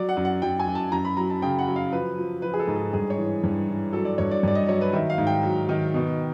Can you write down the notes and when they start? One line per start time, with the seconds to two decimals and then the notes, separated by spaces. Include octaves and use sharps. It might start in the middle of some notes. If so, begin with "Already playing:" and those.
Already playing: F#3 D5
0.09 F#5
0.17 F#2
0.25 F#5
0.42 F#2 G5
0.60 G#5
0.67 F#2
0.75 A5
0.92 F#2 A#5
1.05 B5
1.17 F#3 A#5
1.30 A5
1.42 C#3 G5
1.59 F#5
1.68 F#3
1.76 F5
1.93 F3 B4
2.18 F3
2.42 F3 B4
2.54 G#4
2.59 A4
2.67 G#2
2.76 A4
2.93 G2 G#4
3.10 C#5
3.18 E3
3.43 G2
3.68 E3
3.93 F#3 A4
4.05 D5
4.18 G2 C#5
4.31 D5
4.43 G2 D5
4.55 D#5
4.68 F#3 C#5
4.81 B4
4.93 D#3 E5
5.10 F5
5.18 G#2
5.27 G5
5.43 F#3
5.69 D#3
5.94 B2